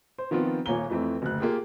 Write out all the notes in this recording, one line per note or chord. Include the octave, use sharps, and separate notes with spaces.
C5
D#3 F3 B3 C4 F4
D#1 A#2 C#5 G#5 A#5 G7
F2 E3 A3 C4
F#1 D2 F#6
A#3 F4 G4 G#4